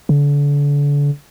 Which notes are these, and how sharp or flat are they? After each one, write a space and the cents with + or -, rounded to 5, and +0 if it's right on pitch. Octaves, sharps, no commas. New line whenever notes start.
D3 -35